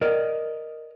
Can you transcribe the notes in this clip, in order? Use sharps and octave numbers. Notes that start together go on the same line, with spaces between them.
A#4 D5 D#5